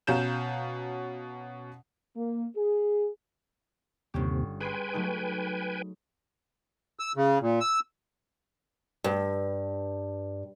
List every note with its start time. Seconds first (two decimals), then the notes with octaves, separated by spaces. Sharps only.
0.07 B2 C#4 F5 A#5 G6 E7
2.16 A#3
2.56 G#4
4.14 G1 D#2 C3 C#4 G4
4.61 G#4 B4 G5 G#5 B5 C6
4.94 F#3 A3 D#4
6.99 E6
7.16 C#3
7.41 A#2
7.60 E6
9.04 G2